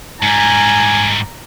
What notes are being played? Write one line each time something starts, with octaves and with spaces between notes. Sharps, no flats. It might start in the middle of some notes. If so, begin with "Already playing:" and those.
G#2 G3 G#5 A#5